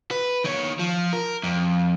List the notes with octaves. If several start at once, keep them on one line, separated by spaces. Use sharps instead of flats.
B4
D#3 C#5
F3
A#4
F2